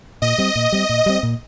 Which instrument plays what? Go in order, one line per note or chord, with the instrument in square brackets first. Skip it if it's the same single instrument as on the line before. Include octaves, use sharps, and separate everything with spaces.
[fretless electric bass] A#2 [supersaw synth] D#5
[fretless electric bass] G3 C4
A#2
G3 C4
A#2
G3 C4
A#2